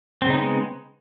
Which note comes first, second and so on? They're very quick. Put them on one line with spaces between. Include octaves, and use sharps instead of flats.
C4 C#3 D#4 B3 G#3